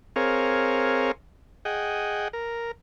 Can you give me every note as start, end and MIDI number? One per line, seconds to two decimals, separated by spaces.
0.16 1.12 60
0.16 1.12 68
0.16 1.12 70
0.16 1.12 73
0.16 1.12 77
1.65 2.28 68
1.65 2.28 75
1.65 2.28 78
1.65 2.28 79
2.33 2.71 70